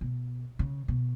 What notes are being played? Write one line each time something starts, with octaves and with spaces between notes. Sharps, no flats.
B2
C#3
B2